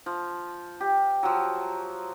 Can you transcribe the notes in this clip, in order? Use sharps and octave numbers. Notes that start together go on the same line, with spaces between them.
F3
G4
F3 F#3